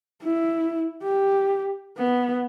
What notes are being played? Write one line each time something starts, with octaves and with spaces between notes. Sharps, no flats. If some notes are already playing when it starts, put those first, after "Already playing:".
E4
G4
B3